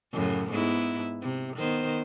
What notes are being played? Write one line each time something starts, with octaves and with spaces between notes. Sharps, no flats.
F#2 A2 C#3
G#2 B3 E4
C3
D#3 B3 C5